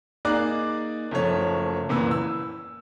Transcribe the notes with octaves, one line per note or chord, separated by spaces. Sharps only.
A#3 D#4 G#4 D5 D6 F#6
F#1 F3 A3 C#5
F#1 A#2 E3 B4 E6
E6